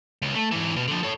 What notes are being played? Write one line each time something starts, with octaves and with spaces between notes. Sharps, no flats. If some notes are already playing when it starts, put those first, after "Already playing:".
C#2
A3
G#2 E3
B2
D3 F3
A4 C#5